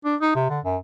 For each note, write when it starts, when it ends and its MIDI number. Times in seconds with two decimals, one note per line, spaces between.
0.05 0.16 62
0.21 0.35 63
0.35 0.49 48
0.50 0.60 50
0.64 0.77 42